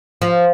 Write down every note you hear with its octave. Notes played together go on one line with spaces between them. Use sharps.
F3